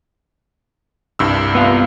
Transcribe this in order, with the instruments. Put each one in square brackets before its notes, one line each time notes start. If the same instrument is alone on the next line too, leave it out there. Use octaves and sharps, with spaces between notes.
[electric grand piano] C2 G2 E6
[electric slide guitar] B3 F4